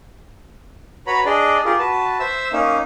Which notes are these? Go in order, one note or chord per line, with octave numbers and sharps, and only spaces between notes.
F#4 B4 C#5 A#5 B5
D4 G#4 D5 D#5
F4 G4 G#4 A#4
F#4 B4 A5
C5 E5 E6
A#3 C#4 D#4